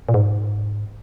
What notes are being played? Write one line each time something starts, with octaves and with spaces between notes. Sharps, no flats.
A#2
G#2